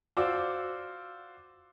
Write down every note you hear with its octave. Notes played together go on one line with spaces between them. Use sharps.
F4 F#4 C5 D5 D6 E6